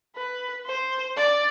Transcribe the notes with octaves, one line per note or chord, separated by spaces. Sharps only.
B4
C5
D5